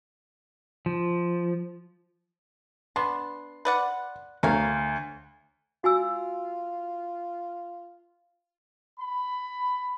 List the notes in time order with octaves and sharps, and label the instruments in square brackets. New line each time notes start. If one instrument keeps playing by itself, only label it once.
[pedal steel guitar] F3
[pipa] B3 D4 [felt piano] C6
[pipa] B4 D5 F#5
[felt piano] D2 [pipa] A#4 C#5 F5
[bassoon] F4 [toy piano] F#4 G#5 E6
[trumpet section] B5